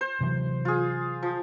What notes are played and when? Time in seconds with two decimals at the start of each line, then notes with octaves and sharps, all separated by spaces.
0.01 C5
0.21 C3 E3 F#3
0.65 F4 G#4
1.23 F3